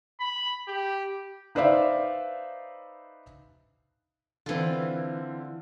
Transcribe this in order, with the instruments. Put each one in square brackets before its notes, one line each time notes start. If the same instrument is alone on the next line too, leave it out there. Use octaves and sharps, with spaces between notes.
[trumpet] B5
G4
[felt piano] D#4 B4 C5 D5 E5 F5
[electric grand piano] D3 C4 [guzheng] E3 F4